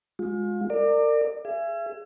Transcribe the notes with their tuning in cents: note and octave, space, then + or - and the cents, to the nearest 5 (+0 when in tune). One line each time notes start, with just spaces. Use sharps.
G#3 +0 F4 +35
A#4 -35 D5 +20
G#4 +0 E5 +40